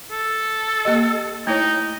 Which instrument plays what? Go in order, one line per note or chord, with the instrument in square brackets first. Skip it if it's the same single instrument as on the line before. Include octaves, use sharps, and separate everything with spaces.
[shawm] A4
[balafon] A#3 G4 D#5
[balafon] A3 E4 C#5 [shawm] D#4